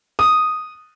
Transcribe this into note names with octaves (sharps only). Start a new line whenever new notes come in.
D#6